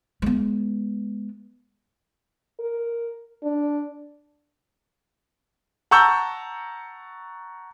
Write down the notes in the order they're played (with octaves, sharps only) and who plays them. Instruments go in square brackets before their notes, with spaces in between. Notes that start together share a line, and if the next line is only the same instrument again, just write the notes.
[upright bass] G#3 B3
[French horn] A#4
D4
[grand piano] F#5 A5 A#5 C#6 E6 G6